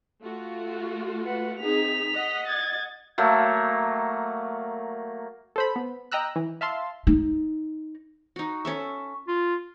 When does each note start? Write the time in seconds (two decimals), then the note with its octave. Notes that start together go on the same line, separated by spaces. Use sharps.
0.22 A3 F4 F#4
1.25 B4 F#5
1.61 C4 D#4 G#4 B6 F7
2.14 D#5 F#5
2.46 G#6 A6
3.18 F#3 A3 A#3
5.56 A4 C5 B5
5.76 B3
6.12 D#5 G5 A#5 E6 F#6
6.36 E3
6.61 E5 F5 A5 C6
7.07 D#4
8.36 D#4 F#4
8.65 C#4 A4 E5
9.28 F4